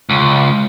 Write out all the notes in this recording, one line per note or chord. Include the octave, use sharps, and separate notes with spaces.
C#2